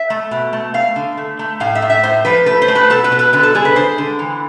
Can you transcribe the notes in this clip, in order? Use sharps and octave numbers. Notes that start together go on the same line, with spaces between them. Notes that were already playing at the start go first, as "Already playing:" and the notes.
Already playing: E5
A3
B2
A3
A3 F5
D3
A3
A3
A2 F5
E5
A2
E5
A2 C5
F3 B4
A3 B4
C5
A3
B4
B2 A4
B4
B2
B4
D3 B4
A4
G#3 G#4
B4
D3 C5
D3
E3